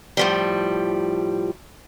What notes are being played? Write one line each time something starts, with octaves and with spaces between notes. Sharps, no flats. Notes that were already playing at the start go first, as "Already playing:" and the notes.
A2 F3 G3